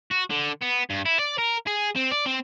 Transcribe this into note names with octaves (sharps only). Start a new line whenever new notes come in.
F#4
D3
B3
G2
E4
D5
A#4
G#4
C4
D5
C4